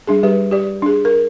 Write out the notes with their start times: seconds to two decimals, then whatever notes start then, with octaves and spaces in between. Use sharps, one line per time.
0.07 G3 D4 G#4
0.23 G3 G4 B4
0.51 G4 D5
0.82 D4 G#4
1.05 A#4